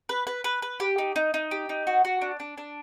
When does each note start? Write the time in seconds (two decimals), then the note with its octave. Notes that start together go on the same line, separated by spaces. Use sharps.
0.09 B4
0.27 B4
0.44 B4
0.62 B4
0.80 G4
0.98 D#4
1.16 D#4
1.34 D#4
1.51 G4
1.69 D#4
1.87 F#4
2.05 F#4
2.22 D4
2.40 D4
2.58 D4